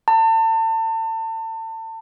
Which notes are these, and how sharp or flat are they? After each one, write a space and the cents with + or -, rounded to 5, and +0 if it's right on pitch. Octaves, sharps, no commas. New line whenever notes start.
A5 +35